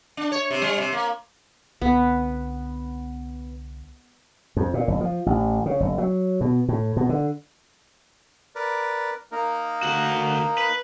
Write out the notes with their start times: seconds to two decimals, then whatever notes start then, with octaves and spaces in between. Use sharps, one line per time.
0.17 D4
0.32 C#5
0.51 C3
0.62 G3
0.78 C3
0.92 A#3
1.82 C2 D3 B3
4.57 F2
4.74 A#2
4.88 F#1
5.01 F3
5.26 A1
5.66 C#3
5.80 F#1
5.98 F#3
6.41 B2
6.68 A2
6.97 B2
7.09 D3
8.55 A#4 B4 D5
9.32 A#3 D#4 A#4
9.82 D2 F#4
10.58 B4